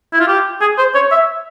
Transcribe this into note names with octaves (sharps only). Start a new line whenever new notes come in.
E4
F4
G4
G#4
C5
C#5
E5